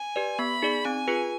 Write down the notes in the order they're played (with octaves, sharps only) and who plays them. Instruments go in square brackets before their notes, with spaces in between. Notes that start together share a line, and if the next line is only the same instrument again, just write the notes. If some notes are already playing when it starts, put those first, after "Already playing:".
Already playing: [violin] G#5
[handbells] G4 B4 D5
[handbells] B3 [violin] B5
[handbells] D#4 G#4 D5
[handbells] C4 [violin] G#5
[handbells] F4 G#4 B4